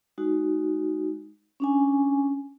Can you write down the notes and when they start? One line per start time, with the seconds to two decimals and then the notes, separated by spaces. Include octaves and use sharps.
0.18 G#3 D#4 F#4
1.60 C#4 D4 G#5